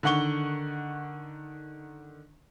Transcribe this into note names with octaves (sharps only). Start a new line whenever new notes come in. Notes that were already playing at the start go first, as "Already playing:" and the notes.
D3 D#3 F#5 C#6 G7